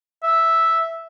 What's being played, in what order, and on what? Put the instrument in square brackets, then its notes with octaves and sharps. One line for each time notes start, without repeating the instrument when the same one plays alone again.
[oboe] E5